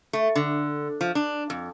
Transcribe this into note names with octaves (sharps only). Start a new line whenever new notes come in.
A3
D3
F3
D4
F2